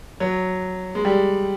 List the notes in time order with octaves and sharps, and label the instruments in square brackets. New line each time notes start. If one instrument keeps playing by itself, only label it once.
[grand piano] F#3
G#3
G3